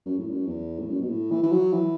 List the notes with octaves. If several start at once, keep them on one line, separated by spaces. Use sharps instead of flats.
F#2
A2
F#2
E2
A2
F#2
B2
A2
E3
E3
F#3
E3